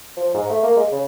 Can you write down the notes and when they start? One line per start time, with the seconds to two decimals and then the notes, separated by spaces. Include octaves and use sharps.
0.17 F3
0.34 G#2
0.49 A3
0.63 A#3
0.76 G#3
0.91 C#3